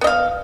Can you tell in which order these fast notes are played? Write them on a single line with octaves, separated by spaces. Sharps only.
B3 D#5 F5